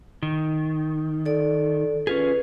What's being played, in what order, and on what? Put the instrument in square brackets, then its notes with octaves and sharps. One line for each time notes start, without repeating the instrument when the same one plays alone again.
[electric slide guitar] D#3
[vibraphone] A4 D5
[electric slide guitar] C#4 F4 G#4 [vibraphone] B4